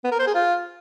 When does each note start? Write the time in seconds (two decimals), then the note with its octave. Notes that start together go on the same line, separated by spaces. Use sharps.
0.04 B3
0.12 A#4
0.19 C5
0.27 G#4
0.35 F4